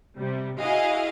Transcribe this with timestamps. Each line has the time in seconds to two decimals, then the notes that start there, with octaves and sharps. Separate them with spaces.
0.18 C3 G3
0.59 E4 F#4 G#4 D#5 F5